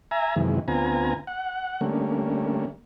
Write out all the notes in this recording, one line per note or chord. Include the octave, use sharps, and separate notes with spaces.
E5 G#5 A#5
F#2 C3 D#3 E3 G#3
D2 B3 C4 F4 G#5 A#5
F#5
D3 G3 A3 A#3 C#4